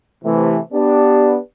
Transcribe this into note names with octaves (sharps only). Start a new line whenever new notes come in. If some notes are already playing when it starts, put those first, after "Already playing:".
C3 E3 A3
B3 D4 G4